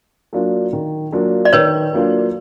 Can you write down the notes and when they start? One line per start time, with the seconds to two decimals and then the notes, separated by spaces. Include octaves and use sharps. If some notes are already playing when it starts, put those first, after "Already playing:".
0.33 F#3 A#3 D4 F4
0.73 D#3
1.12 F#3 A#3 D4 F4
1.45 D5
1.53 D#3 B4 C#5
1.93 F#3 A#3 D4 F4